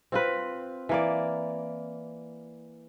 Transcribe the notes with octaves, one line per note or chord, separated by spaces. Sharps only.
C4 F4 B4
E3 A#3 D5